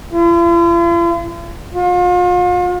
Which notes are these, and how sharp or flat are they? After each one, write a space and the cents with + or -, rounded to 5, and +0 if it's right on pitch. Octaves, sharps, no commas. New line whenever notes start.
F4 -45
F4 +40